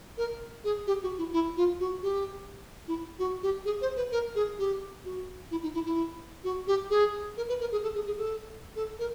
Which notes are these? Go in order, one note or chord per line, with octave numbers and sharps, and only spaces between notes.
A#4
G#4
G4
F#4
E4
E4
F4
F#4
G4
E4
F#4
G4
G#4
C5
B4
A#4
G#4
G4
F#4
E4
D#4
E4
E4
F#4
G4
G#4
A#4
B4
A#4
G#4
A4
G#4
G#4
A4
A4
A#4